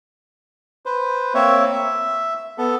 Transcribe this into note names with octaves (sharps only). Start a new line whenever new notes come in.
B4 C5
A#3 C4 C#5 E5
E5
B3 A4